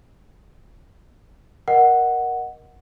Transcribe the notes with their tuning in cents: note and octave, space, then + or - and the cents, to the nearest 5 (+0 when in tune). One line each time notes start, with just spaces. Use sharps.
A#4 +15 D#5 +0 F#5 +0